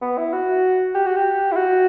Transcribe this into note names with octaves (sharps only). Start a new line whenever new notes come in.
B3
E4
F#4
G4
F#4
G4
E4
F#4